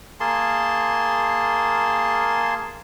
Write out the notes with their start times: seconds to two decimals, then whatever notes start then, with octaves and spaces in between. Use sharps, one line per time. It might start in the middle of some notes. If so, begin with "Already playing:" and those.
0.20 A#3 G#4 A5 C6